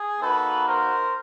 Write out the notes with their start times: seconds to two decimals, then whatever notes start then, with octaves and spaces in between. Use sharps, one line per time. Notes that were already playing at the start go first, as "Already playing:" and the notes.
Already playing: G#4
0.21 A#3 D#4 F#4 A4 B4
0.67 A#4 C5